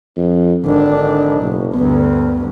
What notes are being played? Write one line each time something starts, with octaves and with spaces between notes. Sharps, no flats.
F2
G#1 D3 D4
F#1 B1
D2 G2 B3